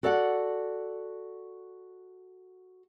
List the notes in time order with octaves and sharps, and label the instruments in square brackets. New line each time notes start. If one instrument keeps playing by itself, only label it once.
[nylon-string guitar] F#4 A4 D5 F5 F#5